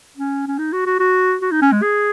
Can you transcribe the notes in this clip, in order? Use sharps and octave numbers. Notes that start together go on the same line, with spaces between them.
C#4
C#4
D#4
F#4
F#4
F#4
F#4
D#4
C#4
G#3
G#4